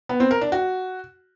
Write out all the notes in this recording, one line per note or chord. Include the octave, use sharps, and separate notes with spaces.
B3
C4
A#4
D4
F#4